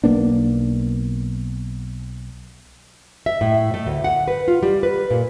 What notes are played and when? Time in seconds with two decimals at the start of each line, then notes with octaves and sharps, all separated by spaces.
0.04 B1 A#3 B3 D4
3.26 E5
3.41 A2
3.74 A3
3.86 D2
4.04 F#5
4.28 B4
4.48 F4
4.63 G3
4.83 B4
5.10 A#2